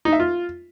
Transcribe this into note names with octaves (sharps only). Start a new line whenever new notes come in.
D#4
E5
F4